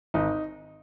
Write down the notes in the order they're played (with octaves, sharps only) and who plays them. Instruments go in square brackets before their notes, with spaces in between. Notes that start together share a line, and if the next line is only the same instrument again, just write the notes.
[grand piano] G#1 D#4